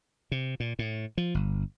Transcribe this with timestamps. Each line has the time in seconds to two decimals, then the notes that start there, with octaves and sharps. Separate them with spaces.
0.32 C3
0.60 A#2
0.79 A2
1.18 F3
1.34 G1